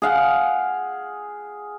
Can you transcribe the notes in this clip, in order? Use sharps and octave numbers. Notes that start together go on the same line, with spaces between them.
G#4 F5 F#5